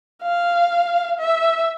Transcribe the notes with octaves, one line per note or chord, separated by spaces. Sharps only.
F5
E5